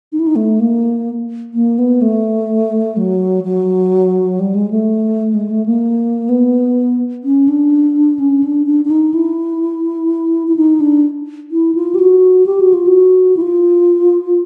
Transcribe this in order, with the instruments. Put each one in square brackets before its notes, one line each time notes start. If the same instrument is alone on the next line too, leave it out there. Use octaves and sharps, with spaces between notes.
[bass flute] D#4
E4
D#4
A3
A#3
A#3
B3
A3
F#3
F#3
G3
G#3
A3
G#3
A3
A#3
B3
C#4
D4
C#4
D4
D4
D4
D#4
E4
E4
D#4
D4
E4
F4
G4
F#4
G4
F#4
F4
F#4
E4
F4